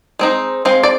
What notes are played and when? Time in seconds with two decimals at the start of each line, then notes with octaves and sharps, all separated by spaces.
0.19 G#3 C4 D#4
0.65 G#3 C4 F5
0.83 D5